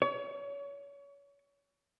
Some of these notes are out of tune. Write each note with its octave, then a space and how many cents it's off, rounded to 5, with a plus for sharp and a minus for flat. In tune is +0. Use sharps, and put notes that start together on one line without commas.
C#5 +30